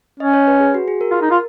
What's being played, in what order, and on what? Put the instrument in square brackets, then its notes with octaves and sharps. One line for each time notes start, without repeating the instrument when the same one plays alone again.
[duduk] C#4 [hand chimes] D#5
[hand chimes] C#5
B4
G#4
F#4
G#4
A#4
[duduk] F4
D#4
F4